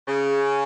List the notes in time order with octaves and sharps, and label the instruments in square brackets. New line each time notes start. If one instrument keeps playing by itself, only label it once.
[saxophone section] C#3